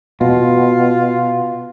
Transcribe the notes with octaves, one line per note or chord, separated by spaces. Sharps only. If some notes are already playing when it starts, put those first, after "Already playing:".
B2 F4